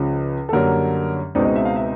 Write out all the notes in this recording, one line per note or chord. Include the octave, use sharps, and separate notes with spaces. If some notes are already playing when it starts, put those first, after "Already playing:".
Already playing: C#2 C#3 F3
A4
F#2 D3 G3 A#3 C#4 A#4
C#2 B2 G#3 C4 D#4 D5
D#5
E5
F5
E5